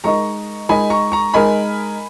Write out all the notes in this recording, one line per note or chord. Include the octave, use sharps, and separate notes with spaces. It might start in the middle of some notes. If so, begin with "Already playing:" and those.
G#3 D#4 A#4 D#5 A#5 C#6
G#3 D#4 A#4 D#5 G#5 B5
A#5 C#6
A#5 C#6
G#3 D#4 A#4 D#5 G#5 B5